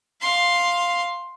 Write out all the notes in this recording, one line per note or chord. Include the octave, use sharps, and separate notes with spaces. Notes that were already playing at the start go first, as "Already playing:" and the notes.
F5 C6